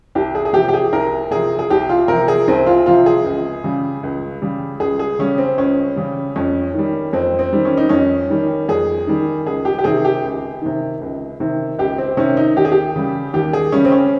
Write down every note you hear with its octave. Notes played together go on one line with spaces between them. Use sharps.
C2 G4
G#4
G#4
C3 F3 G4
G4
G#4
C2 A#4
C3 F3 G#4
G#4
C2 G4
F4
C3 F3 A#4
G#4
C2 C4
F4
C3 F3 F4
G#4
C#2
C#3 G3
C#2
C#3 G3
C#2 G#4
G#4
C#3 G3 C#4
C4
C#2 C#4
C#3 G3
F2 C#4
D#3 G3
F2 C4
C4
D#3 G3
C#4
D#4
F2 C#4
D#3 G3
F2 G#4
D#3 G3
C#2 G#4
G4
G4
C3 D#3 G#4
G4
C#2
C3 D#3
C#2
C3 D#3
C#2 G4
C4
C3 D#3 C#4
D#4
D#2 G4
G#4
G4
C#3 G3
D#2 G4
G#4
C#3 G3 C#4
C4
C#4